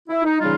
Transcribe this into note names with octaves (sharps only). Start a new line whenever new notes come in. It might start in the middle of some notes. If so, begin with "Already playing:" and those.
E4
D#4
C#3 E3 G3 D#4 F4